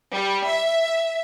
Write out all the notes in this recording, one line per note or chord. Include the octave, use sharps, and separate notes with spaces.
G3
E5